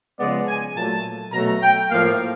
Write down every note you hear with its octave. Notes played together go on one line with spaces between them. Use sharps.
C#3 F3 G#3 B3 D5
G#5
A#2 F#3 A3 A5
B2 F#3 A3 A#5
G5
A2 F3 A#3 F5